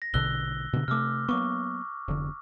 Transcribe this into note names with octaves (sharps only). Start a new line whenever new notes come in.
A#6
A#1 B2 D3 E6 F#6 G7
B2 D3
C3 A3 D6 E6 F6
F#3 A#3 B3 C#6 D6
F1 D3